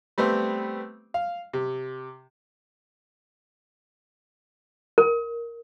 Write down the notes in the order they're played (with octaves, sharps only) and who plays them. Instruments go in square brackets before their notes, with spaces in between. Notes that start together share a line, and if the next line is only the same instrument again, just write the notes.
[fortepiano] G3 A3 B3 C4
F5
C3
[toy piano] A#4